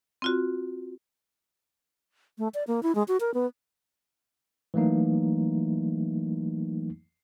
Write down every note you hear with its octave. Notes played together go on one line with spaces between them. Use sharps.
C4 F4 F#4
A3
D5
A#3
E4
G#3
F#4
A#4
B3
E3 F#3 A3 A#3 D#4